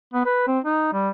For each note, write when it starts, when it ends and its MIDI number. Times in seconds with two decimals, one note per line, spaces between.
0.14 0.25 59
0.26 0.43 71
0.47 0.59 60
0.65 0.91 63
0.93 1.10 55